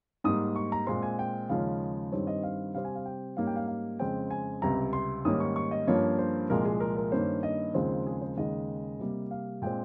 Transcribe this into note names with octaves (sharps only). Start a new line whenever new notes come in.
G#2 G3 A#3 D#6
C#6
A#5
A#2 G#3 C4 C6
G#5
G5
D#2 C#3 F3 G#3 C#4 F5
G2 D#3 G3 C4 C#5
D#5
F5
C3 G3 C4 F5
G#5
F5
G5
G#2 G3 A#3 C#4 F5
G5
F5
F5
F2 C#3 G#3 C4 G5
G#5
C#2 C3 G3 A#5
C6
G#2 D#3 G3 A#3 C#4 D#6
C#6
C#6
D#5
G2 F3 A#3 C#4 C#5
C5
C2 A#2 F3 G#3 A#4
G#4
A#4
A#4
G2 D#3 A#3 C#4 C5
D#5
D#2 C#3 F3 G#3 C4 C5
G#4
C5
D#2 C#3 G#3 D#5
C3 G3 A#3
F5
A#2 G#3 C4 G5